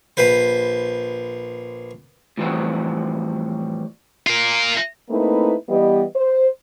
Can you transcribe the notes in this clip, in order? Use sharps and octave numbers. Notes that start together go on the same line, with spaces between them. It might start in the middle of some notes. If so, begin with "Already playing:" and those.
A#1 B4 C5
A2 E3 F3 G3 C4 F#4
F4 A#4
A3 A#3 C4 D#4 E4 B4
E3 G3 B3 G4 D#5
C5